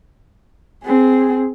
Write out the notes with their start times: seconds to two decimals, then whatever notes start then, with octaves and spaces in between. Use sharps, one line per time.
0.84 C4 G#4